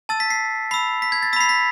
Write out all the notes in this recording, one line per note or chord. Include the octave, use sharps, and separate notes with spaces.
A5 E6 A6
B6
C7
B5 E6 C7
B6
G#6
A6
B5 E6 B6 C7
B6